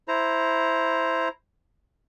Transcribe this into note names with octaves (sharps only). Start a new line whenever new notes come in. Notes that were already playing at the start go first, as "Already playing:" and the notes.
E4 C5 A#5